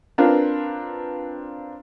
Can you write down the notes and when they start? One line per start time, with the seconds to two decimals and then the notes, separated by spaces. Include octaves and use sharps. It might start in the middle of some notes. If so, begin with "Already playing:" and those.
0.18 C4 D4 F4 A#4 B4 F5